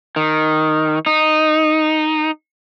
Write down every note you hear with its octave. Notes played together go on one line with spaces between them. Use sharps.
D#3
D#4